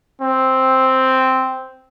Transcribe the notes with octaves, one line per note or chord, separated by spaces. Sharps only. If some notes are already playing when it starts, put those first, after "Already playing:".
C4